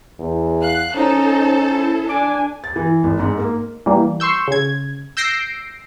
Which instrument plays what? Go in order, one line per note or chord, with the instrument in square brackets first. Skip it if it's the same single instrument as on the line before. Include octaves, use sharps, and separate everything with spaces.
[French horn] E2
[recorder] F5 [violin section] F#6
[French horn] C#4 [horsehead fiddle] D#4 [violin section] A4 [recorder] C5
[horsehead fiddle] E4
[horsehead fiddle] D4 G#5 [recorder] D6
[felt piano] A6
E3
G#1
G#2
A#3
[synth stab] E3 G3 A#3
C6 C#6 E6 G6
C#3 G#6
E6 G6 A#6 C7 D7